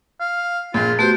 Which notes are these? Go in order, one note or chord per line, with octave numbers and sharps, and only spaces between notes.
F5
A#1 A#2 F4 G#4
A3 B3 F#4 G4 C5